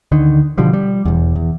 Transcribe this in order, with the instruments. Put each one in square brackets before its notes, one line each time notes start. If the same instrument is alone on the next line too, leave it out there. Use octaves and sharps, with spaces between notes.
[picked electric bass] D2 D3 D#3
B2 D3 F3 G3
G3
E1 E2
E2